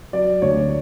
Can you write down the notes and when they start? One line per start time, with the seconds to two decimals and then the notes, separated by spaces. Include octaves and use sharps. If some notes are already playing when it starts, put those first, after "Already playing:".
0.13 F#3 D5
0.42 D2 C#5